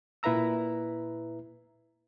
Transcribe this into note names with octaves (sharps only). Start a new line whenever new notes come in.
A#2 E4 B4 E5 A#5 E6